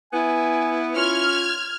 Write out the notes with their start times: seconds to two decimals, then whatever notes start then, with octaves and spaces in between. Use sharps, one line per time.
0.13 B3 E4 G#5
0.96 C#4 F4 F6 G#6